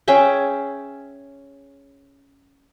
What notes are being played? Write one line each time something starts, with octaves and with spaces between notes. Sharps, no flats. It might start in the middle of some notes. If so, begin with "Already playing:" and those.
C#4 G#4 E5 G5